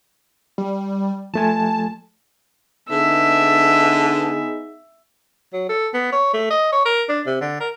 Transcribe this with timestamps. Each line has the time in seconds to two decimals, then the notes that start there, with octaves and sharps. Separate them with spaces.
0.58 G3
1.34 F3 A3 G#5 A5
2.91 D3 B3 D#4 G#4 E5
5.53 F#3
5.69 A4
5.94 B3
6.12 C#5
6.34 A3
6.50 D#5
6.72 C#5
6.86 A#4
7.09 D4
7.27 C3
7.41 D3
7.60 A#4